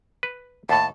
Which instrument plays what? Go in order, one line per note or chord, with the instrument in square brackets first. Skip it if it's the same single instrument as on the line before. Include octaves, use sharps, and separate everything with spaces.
[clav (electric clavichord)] B4
[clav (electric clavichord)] D#2 A2 [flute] A5